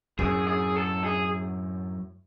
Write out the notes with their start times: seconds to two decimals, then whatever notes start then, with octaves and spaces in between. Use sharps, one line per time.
0.19 F#2 A2 G#4
0.47 G#4
0.76 A4
1.04 G#4